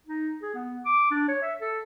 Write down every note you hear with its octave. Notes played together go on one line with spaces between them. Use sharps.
D#4
G#4
B3
D6
D4
C#5
E5
A4